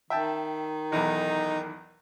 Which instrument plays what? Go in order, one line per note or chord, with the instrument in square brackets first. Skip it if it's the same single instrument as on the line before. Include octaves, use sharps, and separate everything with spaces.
[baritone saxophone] D#3 [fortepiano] E5 G5 A5
[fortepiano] B1 E2 [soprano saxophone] D#4